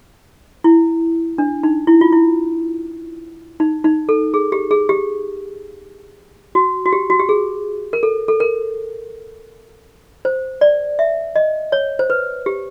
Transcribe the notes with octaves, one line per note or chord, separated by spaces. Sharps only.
E4
D4
D#4
E4
F4
E4
D#4
D#4
A4
G#4
G4
G#4
G4
F#4
F#4
G4
F#4
G4
G#4
A#4
A4
A4
A#4
C5
D5
E5
D#5
C#5
C5
B4
G4